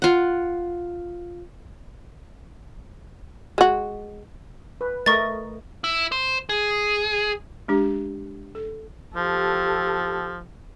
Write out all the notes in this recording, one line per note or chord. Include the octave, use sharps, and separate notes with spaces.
F4 F#5
G#3 F#4
B4
A3 A#4 D#5 C#6 A6
E4
C5
G#4
G#3 D4 G4
A4
F3 G4 A4